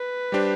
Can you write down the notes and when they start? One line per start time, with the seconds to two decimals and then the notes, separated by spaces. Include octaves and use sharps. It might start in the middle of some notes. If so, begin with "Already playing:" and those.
Already playing: B4
0.32 G3 D4 G4 C5